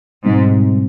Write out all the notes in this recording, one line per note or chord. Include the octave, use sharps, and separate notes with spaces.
C2 G#2 B2 G3 C4